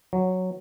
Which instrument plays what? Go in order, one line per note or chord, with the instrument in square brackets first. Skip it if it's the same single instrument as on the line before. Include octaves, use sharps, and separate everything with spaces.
[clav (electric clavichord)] F#3